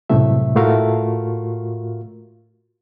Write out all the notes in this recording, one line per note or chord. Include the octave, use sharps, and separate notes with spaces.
C2 F#2 A2 C3 A3 E5
A2 A3 F4 F#4 A#4 F5